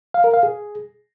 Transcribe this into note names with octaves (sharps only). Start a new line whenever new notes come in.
F5
A#4
F5
G#4